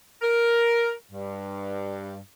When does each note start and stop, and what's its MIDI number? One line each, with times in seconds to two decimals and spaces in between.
0.21 0.92 70
1.11 2.17 43